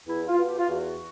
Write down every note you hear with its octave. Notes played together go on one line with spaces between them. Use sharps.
E2 E4
F4
B2
G4
F4
E2 F#4